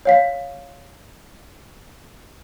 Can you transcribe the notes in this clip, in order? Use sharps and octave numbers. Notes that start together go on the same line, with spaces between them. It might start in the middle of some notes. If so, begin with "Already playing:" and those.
C#5 F5 B6